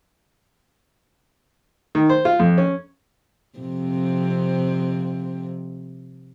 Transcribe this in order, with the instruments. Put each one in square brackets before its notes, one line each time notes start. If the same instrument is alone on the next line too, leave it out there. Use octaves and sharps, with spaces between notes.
[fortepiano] D#3
C5
F4
F2
C#4
[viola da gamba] F2 C3 C4